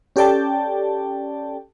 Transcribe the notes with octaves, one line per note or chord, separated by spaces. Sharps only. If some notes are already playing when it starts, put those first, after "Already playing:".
C#4 G4 A4 D5 G5 A5